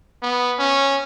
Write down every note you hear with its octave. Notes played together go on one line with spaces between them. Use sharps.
B3
C#4